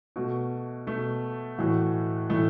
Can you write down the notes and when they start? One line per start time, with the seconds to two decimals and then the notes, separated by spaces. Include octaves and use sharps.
0.16 B2 A3 F#4
0.87 B2 A3
1.58 A2 E3 A3 F#4
2.30 A2 E3 A3